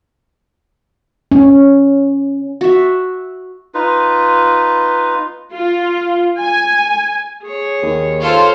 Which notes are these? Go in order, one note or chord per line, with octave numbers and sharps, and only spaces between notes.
C#4
F#4 E5
D#4 F4 B4
F4
G#5
G#4 C#5
D#2
F4 A4 C5 C#5 C6